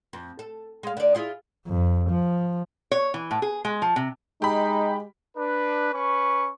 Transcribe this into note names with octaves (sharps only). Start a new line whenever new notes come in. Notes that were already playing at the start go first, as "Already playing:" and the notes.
F2
A4
G#3 F5
D3 D5
E4 F4 G#4
F2
F3
C#5
E3
A2
G#4
G#3
F3
C3
G#3 D#4 G4 B5
D4 B4
C#4 B4 C#6